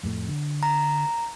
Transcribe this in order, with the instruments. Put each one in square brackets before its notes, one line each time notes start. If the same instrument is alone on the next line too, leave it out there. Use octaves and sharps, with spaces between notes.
[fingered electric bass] F2 A2 A3
D3
[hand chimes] A#5